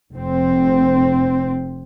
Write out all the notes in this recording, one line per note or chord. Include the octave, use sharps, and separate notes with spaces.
F1 C4